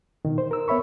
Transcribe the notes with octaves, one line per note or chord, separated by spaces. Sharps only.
B2 D#3
C5
A#4 E6
B3 C#5 E5 B5 C#6